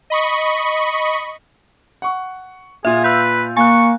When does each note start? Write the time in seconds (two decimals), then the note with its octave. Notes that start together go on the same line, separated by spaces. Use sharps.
0.10 D#5 B5 C#6
2.02 F#5 C#6
2.85 A#2 F4 G#4 E5
3.04 B4 E6 G6
3.57 A#3 G#5 C#6 F#6